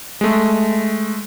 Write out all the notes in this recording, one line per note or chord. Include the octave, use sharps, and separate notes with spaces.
G#3 A3